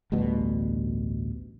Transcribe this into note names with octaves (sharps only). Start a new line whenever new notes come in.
A1 D2 G2 B2